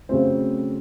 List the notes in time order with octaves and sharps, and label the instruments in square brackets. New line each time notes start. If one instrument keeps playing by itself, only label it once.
[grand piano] C#3 F#3 A3 C4 C5